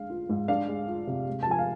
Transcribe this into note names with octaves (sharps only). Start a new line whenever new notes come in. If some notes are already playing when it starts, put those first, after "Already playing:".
Already playing: G#3 D4 F5
F4
G#2
D4 F5
G#3
F4
C3
G#3
A5
F3 G#5
F5